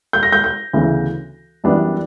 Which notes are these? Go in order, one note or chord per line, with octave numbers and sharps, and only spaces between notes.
G6
A#6
G6
G6
D2 C#3 E3 B3
F#2 E3 G3 B3 D4